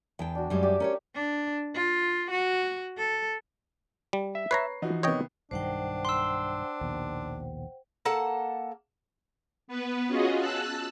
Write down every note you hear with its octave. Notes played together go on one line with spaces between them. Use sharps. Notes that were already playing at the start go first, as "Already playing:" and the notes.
E2 G5 A5
D4 F#4
F#2 G3 G#3
G4 D5 E5
C#4 G4 A#4 C#5
D4
F4
F#4
A4
G3
E5
B4 C#5 A#5 C7
E3 F3 D#4 F#4
C3 D#3 B3 C#5 D#5 G5
B1 G2 D#3 D4 C5 F#5 G5
C6 E6
A#1 D#2 B2
A#3 A4 F#5 A5
B3 B4
C#4 F4 F#4 G#4 D#5
A5 E6 F#6